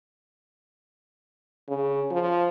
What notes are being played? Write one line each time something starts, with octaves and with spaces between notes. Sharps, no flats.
C#3
F3